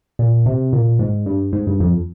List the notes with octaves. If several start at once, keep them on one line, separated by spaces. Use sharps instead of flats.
A#2
C3
A#2
G#2
G2
G#2
G2
F2